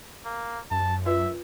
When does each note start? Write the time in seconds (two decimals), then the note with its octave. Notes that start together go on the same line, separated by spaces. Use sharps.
0.25 A#3
0.71 F#2 A5
1.06 F4 B4 E5